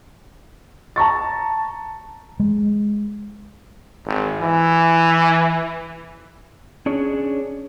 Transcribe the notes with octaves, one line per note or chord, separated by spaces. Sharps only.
A5 A#5 C#6 A6
G#3
G#1
E3
C#4 D4 G#4 C#5